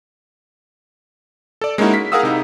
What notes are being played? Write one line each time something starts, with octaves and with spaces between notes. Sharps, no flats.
A4 D5
G#3 A#3 C#4 D#4 E4 F#4
B6
G#4 A#4 F5 F#5 D#6 E6
C3 D#4 E4